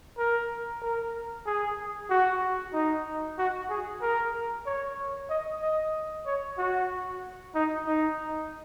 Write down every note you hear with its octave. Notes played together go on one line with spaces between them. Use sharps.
A#4
A#4
G#4
F#4
D#4
F#4
G#4
A#4
C#5
D#5
D#5
C#5
F#4
D#4
D#4